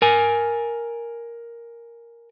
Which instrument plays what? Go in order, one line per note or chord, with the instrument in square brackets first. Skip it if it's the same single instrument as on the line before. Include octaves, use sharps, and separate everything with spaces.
[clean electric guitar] A#4 G#5